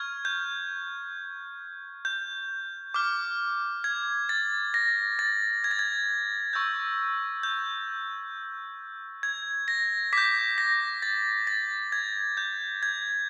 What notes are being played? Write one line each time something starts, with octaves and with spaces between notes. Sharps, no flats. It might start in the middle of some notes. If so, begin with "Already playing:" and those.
Already playing: C#6 F6 G#6
G6
G6
D6 F6
G#6
A6
A#6
A6
G#6
A6
G#6
C#6 E6 G6
G6
G#6
A#6
D6 G6 B6
A#6
A6
A6
G#6
G6
G#6